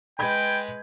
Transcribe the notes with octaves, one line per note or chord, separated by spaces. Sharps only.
G#3 B4 G5 B5 G6 G#6